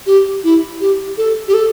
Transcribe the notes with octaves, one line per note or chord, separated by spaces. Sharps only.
G4
E4
G4
A4
G4
A4